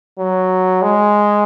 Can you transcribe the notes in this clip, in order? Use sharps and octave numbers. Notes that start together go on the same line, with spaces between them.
F#3
G#3